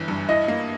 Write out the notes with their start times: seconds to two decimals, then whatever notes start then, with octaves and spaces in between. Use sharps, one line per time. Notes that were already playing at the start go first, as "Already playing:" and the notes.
Already playing: G1 E3
0.08 G2
0.29 E4 D#5
0.48 A#3